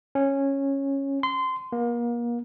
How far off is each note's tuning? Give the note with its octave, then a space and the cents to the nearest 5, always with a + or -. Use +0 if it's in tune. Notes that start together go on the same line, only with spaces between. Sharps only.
C#4 -10
C6 -20
A#3 +35